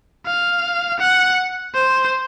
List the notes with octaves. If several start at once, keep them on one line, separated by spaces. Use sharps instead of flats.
F5
F#5
C5